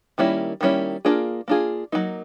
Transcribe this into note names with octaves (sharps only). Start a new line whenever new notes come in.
D#3 G3 A#3 C#4 E4
D#3 G3 A#3 C#4 E4
A#3 D4 F4 G#4
A#3 D4 F4 G#4
F#3 A#3 D#4